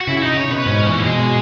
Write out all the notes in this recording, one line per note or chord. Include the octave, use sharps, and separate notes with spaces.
F#4
C#3 E4
E4
D#4
C#3
C#5
B2 B4
G#2 C#4
A#2 E3
A#3
B2 G#3